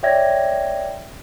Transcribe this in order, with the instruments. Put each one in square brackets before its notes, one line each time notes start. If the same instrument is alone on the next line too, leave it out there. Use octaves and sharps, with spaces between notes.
[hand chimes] C#5 D5 E5 G5 G#6 A#6